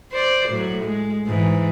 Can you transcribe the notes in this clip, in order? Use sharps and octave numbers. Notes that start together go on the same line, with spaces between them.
C5 D5
A2 F#3
G#3
G#2 E3